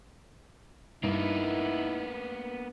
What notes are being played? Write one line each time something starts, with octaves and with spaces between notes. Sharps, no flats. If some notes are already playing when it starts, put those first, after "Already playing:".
G2 A#3 B3 D#4 E4